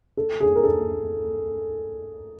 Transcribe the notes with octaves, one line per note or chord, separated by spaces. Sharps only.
A4
G#4
A#4
A4